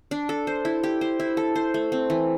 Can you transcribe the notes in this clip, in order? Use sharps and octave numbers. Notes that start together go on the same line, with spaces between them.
D4
A4
C5
E4
G4
C5
E4
A4
C5
A3
C4
E3